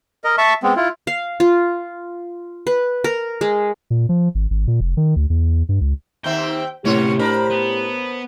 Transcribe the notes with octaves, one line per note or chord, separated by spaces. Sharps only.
A#4 D#5
E5 A5 C#6
G#3 B3 C4
E4 F4
F5
F4
B4
A#4
G#3
A#2
F3
G#1
G#1
A#2
F1
D#3
D2
E2
G2
C#2
D#2 C4 E5 G5
A2 C3 A#3 C#4 G4 C#5
D4 A#4 C5 B5
B3